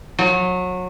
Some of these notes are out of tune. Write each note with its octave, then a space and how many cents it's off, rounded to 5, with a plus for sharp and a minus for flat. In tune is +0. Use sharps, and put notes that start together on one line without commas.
F#3 -25